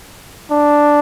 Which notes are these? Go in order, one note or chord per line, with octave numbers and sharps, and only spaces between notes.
D4